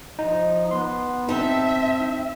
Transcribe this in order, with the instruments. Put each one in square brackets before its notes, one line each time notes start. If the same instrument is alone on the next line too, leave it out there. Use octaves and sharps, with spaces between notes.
[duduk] F3 [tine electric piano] D#4
[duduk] B3 [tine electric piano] C6
[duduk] C4 [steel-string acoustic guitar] D#4 A5 [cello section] E5